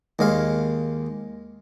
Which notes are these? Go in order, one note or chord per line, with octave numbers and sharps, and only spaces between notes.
D#2 G#3 F5